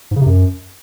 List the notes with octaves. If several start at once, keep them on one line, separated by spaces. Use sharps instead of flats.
G#2
C#3
C3
F#2